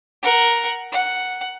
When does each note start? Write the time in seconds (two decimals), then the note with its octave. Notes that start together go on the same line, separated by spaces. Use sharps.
0.23 A#4 F#5
0.92 F#5